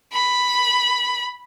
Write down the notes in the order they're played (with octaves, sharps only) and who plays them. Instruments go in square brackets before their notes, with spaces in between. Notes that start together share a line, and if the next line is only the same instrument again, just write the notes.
[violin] B5